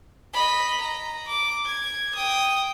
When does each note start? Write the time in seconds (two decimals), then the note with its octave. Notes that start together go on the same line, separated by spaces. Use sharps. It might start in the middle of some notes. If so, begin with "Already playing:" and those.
0.33 D#5 B5
0.81 A#5
1.27 D6
1.66 G#6
2.15 G5 D#6